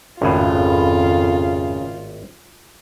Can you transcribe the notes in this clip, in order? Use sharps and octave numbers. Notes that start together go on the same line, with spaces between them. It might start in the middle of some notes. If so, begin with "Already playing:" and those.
G#1 F2 A2 C#3 F4